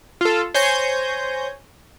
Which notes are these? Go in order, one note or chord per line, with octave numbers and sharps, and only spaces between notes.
F4 A4
C5 C#5 G#5 G6 A#6